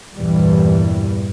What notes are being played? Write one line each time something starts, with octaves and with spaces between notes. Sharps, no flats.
E2 G2 A#2 E3 G3